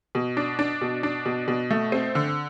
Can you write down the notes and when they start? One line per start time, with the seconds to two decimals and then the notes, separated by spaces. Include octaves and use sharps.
0.15 B2
0.37 D4
0.59 D4
0.81 B2
1.03 D4
1.26 B2
1.48 B2
1.71 A3
1.92 C4
2.15 D3